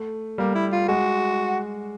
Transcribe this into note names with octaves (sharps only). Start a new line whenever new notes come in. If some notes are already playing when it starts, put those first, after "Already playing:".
Already playing: A3
G3 A#3
E4
F4
G#3 F#4